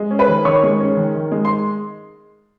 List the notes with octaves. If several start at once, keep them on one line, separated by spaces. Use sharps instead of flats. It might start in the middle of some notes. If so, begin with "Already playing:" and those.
Already playing: G#3
C#4
B4 B5
D#3
D#3 C#5 C#6
G#3
C#4
D#3
D#3
G#3
C6